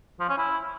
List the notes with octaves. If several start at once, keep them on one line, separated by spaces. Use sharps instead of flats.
F3
C#4
E4